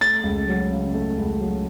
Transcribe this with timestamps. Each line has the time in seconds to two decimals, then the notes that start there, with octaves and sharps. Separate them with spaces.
0.01 A3 A6
0.23 C#2
0.48 F#3
0.71 C#3
0.94 A3
1.17 C#2
1.40 F#3